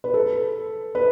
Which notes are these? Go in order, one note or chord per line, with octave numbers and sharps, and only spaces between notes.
B4
A4
B4